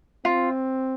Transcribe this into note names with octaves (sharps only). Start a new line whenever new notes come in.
C4 F4